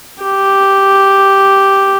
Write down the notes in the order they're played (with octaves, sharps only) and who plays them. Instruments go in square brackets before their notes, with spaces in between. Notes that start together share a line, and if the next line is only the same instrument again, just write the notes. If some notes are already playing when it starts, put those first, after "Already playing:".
[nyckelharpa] G4